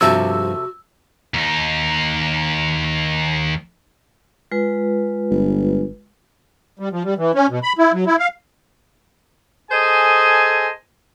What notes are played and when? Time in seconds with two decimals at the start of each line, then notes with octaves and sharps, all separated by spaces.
0.01 G2 C3 F3 F#4 A4 E5 E6
1.34 D#2 D#4
4.52 G#3 F4 B4
5.31 G1
6.79 G3
6.92 F3
7.05 G3
7.18 E3
7.35 C#4
7.50 B2
7.63 B5
7.78 E4
7.93 F#3
8.07 E4
8.19 F5
9.71 G#4 A4 C5 D#5 G#5